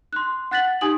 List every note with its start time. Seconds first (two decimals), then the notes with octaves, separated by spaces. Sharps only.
0.13 C6 F#6
0.51 F#5 F#6 A6 B6 F#7
0.81 D#4 G4 G#5 D#6 F#7